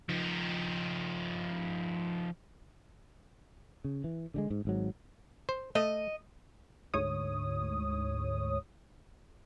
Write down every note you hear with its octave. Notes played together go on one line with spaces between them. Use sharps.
F3 D#4
C#3
E3
D3 G3 G#3
G#2
G#1 G#2 F#3
C5
A3 D#5
D2 G#2 C#5 D#6